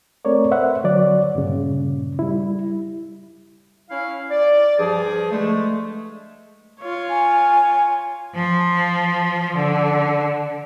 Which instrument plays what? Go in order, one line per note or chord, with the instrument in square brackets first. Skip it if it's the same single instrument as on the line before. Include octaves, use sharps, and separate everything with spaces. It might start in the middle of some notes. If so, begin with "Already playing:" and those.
[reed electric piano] A3 C4 A#4 C#5 D5
B4 C5 E5 F#5
D3 F#3 C#5 D5
G2 A#2 C#3
G3 E4
[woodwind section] C#4 E4 F5
D5
G2 F3 G#4
D3 G#3 A3
[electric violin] F4 C#5
[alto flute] G#5
[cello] F3
D3